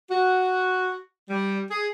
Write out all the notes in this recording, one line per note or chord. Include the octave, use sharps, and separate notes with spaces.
F#4
G3
G#4